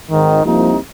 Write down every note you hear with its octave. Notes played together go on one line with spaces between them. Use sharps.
G#1 G#2 D#3
C2 C3 F3 A#3 D#4